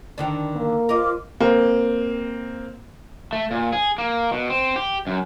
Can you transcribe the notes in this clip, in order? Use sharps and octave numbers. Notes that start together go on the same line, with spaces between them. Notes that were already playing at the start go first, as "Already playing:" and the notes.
D3 D#3 D4
A#3
F4 A#4 D#5 D6
A#3 C4
A3
A#2
G#4
A#3
B2
C4
G4
F#2